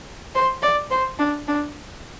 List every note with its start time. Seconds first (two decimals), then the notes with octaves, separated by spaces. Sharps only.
0.35 C5
0.62 D5
0.91 C5
1.19 D4
1.48 D4